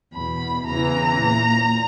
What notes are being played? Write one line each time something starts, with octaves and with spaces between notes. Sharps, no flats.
E2 B2 B5
E2 C#3 E3 A#5
A#2